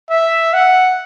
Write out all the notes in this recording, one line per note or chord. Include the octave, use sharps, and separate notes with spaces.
E5
F#5